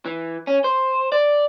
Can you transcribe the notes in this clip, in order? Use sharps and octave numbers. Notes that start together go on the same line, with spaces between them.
E3
C#4
C5
D5